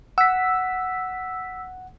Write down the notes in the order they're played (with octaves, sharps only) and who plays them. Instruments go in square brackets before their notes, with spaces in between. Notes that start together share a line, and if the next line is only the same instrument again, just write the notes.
[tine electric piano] F#5 [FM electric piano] E6 B6